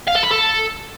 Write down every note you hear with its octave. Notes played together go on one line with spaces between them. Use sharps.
F5
A4
B5
A4